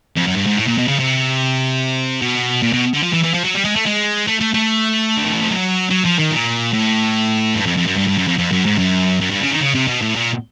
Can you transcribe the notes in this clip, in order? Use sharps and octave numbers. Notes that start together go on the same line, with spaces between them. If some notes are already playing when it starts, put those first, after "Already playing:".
F2
F#2
G2
G#2
A2
A#2
B2
C#3
C3
B2
A#2
B2
D3
F3
E3
E3
F3
F#3
G3
G#3
A3
G#3
A3
A3
A3
D3
D#3
E3
F3
F#3
F#3
F3
D#3
A#2
A2
G2
F2
F2
F#2
G2
G2
F#2
F2
F2
F#2
G#2
F#2
F#2
G2
C#3
D#3
C#3
C3
B2
A2
A#2